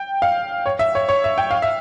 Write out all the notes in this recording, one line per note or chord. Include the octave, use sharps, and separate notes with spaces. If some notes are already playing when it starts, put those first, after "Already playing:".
Already playing: G5
F5
C#5
E5
C#5
C#5
E5
G5
F5
E5